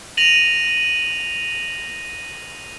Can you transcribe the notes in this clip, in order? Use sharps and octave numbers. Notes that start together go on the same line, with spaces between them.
A#6 D#7 F7 F#7